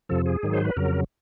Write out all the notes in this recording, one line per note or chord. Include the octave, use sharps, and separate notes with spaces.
F2 C3 F3 A4
G#4
G#2 D#3 F#3
C5
B4
F2 C#3 F#3 A#4